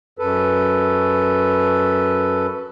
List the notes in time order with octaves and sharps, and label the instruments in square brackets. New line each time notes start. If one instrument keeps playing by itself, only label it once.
[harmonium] F#2 A4 B4